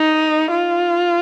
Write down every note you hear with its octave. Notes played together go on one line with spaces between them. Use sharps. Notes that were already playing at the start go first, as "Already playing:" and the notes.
Already playing: D#4
F4